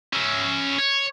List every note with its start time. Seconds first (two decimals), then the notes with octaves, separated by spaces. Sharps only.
0.13 C#4 E5
0.78 C#5